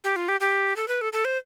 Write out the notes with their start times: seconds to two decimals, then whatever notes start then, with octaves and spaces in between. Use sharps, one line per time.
0.04 G4
0.16 F4
0.28 G4
0.40 G4
0.76 A4
0.88 B4
1.01 A4
1.13 A4
1.25 C5